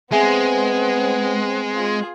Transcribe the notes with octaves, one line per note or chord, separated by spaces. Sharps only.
G#3 B3 C4 G#4 B4 E5 G#5
F4 G#4